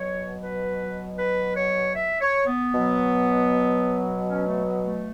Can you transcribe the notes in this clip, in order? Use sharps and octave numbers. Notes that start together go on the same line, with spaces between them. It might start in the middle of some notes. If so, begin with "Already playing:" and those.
Already playing: B2 F#3 C#5
B4
B4
C#5
E5
C#5
B3
B2 F#3
C#4
A3
B3
A3